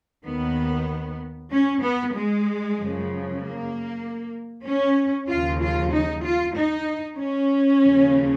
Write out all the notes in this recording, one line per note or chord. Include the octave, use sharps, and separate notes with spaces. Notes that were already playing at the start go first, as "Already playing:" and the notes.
D#2 D#3 B3
C#4
B3
G#3
F#2 C#3 F3
A#3
C#4
D#2 C#3 F3 F4
F4
D#4
F4
D#4
C#4
D#2 C#3 F3